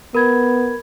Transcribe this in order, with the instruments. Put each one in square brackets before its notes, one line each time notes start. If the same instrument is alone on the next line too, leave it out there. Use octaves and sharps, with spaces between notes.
[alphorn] B3 [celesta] A#4 B5 G#6